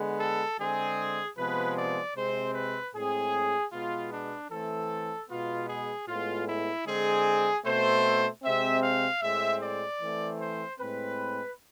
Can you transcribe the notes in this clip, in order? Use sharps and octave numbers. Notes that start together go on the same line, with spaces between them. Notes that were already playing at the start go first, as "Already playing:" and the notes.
Already playing: D3 G#3 B3
A4
D3 G#3 C4 G#4
C3 F3 G#3 B3 B4
D5
C3 G#3 C4 C5
B4
A2 G#3 C4 G#4
B2 G#3 B3 F4
D4
E3 A3 C4 A4
B2 G#3 B3 F4
G#4
A2 G#3 B3 F4
E4
D3 G#3 C4 G#4
B2 A3 C4 C5
C3 G#3 C4 E5
F5
A2 G#3 C4 E5
D5
E3 A3 C4
C5
A2 G#3 C4 B4